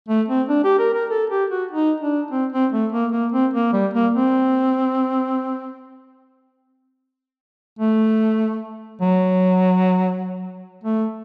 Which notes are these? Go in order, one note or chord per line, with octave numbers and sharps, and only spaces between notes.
A3
C4
D4
G4
A#4
A#4
A4
G4
F#4
D#4
D4
C4
C4
A3
A#3
A#3
C4
A#3
G3
A#3
C4
A3
F#3
A3